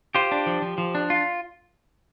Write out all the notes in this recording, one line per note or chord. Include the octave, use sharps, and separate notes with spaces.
F4 G4 C5
D4
F3
F3
F3
D4
F4